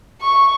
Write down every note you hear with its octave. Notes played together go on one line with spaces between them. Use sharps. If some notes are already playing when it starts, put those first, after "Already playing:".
C#6